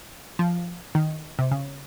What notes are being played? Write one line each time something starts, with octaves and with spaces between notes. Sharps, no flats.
F3
D#3
C3
C#3